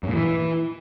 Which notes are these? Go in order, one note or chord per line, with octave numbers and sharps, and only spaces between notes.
F#2
A#2
E3